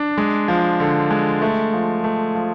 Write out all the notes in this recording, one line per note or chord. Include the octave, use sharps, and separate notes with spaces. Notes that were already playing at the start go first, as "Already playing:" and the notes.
Already playing: D4
G#3
F3
D3
G#3
A3
F3
A3
F3